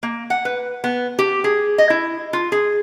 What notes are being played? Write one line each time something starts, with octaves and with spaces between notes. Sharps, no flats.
A#3
F#5
B4
B3
G4
G#4
D#5
E4
F4
G#4